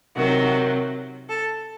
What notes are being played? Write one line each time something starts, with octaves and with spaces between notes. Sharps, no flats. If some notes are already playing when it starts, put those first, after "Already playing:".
C3 D#3 F#3 F#4
A4